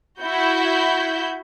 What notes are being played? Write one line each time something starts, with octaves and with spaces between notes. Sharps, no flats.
E4 F#4 G6